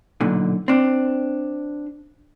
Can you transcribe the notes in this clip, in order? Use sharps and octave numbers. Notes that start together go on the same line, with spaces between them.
B1 A#2 D3
C4 D4